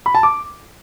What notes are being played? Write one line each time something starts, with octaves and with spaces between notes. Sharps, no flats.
B5
A5
D6